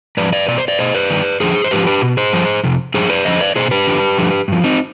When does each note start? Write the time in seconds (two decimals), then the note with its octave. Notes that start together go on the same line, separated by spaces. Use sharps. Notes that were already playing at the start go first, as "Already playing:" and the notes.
0.17 G#2 F3 B4 D5
0.33 B4 D5
0.48 B2 D5
0.58 C5
0.68 B4 D5
0.79 B2 C5 D#5
0.94 B4 D5
1.10 G2 D#3
1.40 F2 D3 F3 G#4 C5
1.64 C5
1.71 G#2 F3 G4 B4
1.87 G4 B4
2.02 B2
2.17 G#4 C5
2.33 G2 F3
2.64 F2 C3
2.94 G2 F3 G#4 C5
3.10 B4 D5
3.25 F2 D3 F3 C5 D#5
3.41 B4 D5
3.56 B2 G#4 C5
3.71 G4 B4
3.87 F2 D3 F3
4.18 G2 D3 F3
4.48 G2 F3
4.64 C4 D#4